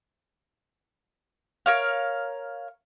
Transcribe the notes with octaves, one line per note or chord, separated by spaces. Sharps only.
A#4 C#5 F5